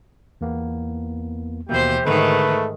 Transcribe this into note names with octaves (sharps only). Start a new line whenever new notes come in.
E2 A#3 B3
D#2 B2 E3 A#3 G4 C5
G#2 D3 D#3 A3 B4